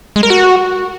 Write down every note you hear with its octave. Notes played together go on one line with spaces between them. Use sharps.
G#3
A#4
F#4